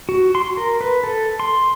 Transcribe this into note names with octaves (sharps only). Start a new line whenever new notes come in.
F#4
C6
A#4
B4
A4
C6